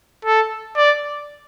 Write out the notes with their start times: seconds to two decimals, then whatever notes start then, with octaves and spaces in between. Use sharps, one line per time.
0.25 A4
0.77 D5